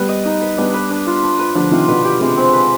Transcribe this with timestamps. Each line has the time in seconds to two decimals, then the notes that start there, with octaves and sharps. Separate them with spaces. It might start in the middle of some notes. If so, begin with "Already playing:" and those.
Already playing: G3 B3 B4
0.09 D#5
0.25 D#4
0.41 B4
0.58 G3 B3 D4
0.74 B4
0.90 D4
1.07 F4
1.23 D4
1.39 B4
1.55 D3 F3 D4
1.71 C3 D#3 F4
1.87 B2 D3 B4
2.04 G4
2.20 C3 G#3
2.37 C4
2.53 B4